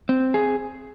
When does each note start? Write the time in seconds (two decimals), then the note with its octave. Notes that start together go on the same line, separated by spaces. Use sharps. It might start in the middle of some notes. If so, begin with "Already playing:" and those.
0.09 C4
0.34 G#4